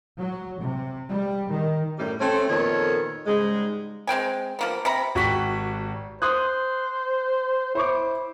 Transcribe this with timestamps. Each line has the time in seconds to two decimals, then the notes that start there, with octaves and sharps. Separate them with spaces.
0.19 F#3
0.62 C3
1.11 G3
1.52 D#3
1.99 F#2 A2 G3
2.20 A3 C4 C#4
2.50 F2 A#2 D#3 B3 A4 C#5
3.27 G#2 C#3 G3 G#3
4.07 G#3 C4 G5 G#5
4.59 F3 A#3 B3
4.85 C3 A#5 B5
5.15 G#1 F#4 G4 C#6 B6
6.22 C5 C6 D#6 F#6
7.75 E4 C5 C#6 D6